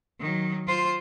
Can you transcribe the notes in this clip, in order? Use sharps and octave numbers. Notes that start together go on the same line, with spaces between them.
D#3 F#3
F4 C5